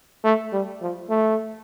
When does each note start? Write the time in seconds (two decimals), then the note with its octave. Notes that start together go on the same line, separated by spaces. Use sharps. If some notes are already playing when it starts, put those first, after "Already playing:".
0.24 A3
0.52 G3
0.81 F3
1.09 A3